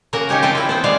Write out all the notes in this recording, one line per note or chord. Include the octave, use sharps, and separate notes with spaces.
C#3 A#3 F#4 A#4
C#4 D#4 G4 C#5
C4 F4 G5 A5
C4 E4
B3 C5 G5
C#3 G#3 F4 D5 F5